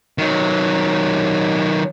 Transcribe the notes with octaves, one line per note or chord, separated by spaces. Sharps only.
D#3 F#3